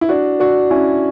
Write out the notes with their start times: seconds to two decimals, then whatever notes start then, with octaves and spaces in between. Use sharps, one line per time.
0.01 E4
0.09 D4 F#4
0.40 D4 F#4
0.70 C#4 E4